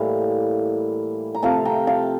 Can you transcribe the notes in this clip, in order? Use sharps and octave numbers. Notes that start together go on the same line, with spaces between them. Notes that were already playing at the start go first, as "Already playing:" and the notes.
Already playing: A2 E3 G3 A#3 F5
A#5
C3 F3 A3 F5 A5
G5 A#5
F5 A5